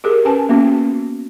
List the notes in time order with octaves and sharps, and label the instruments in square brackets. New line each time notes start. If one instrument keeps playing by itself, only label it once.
[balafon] G4 G#4 A#4
C#4 B4 G#5 A5
A#3 B3 C#4 F#4